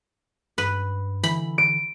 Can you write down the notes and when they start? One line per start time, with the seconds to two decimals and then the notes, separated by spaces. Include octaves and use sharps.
0.58 G2 B4
1.24 D3 E3 B5
1.58 D7